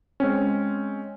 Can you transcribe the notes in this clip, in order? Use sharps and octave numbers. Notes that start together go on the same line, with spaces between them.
G#3 C4 C#4